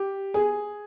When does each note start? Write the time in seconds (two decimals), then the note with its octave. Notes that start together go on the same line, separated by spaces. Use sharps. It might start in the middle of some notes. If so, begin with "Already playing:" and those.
Already playing: G4
0.34 G#4